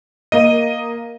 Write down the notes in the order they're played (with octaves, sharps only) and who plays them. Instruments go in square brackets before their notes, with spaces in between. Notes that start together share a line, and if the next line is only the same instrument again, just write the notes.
[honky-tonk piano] A#3 D#7 [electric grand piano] D#5